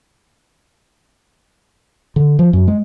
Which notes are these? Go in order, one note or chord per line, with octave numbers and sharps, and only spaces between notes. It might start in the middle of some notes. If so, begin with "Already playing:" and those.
D3
F3
F#2
G#3